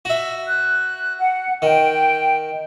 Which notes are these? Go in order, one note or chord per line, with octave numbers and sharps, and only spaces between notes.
F#4 E5
F#6
F#5
D#3 G5